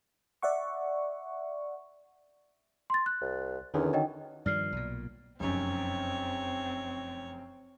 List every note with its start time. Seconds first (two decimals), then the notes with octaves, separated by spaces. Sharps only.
0.42 D5 E5 F#5 C#6
2.90 C6 A6
3.06 F#6
3.21 C2
3.74 E2 D3 D#3 C#4
3.93 F#3 D#4 D#5 G5
4.46 G2 D#3 F3 D5 F6 C7
4.72 B1 A#2
5.40 F1 F#2 C4 C#5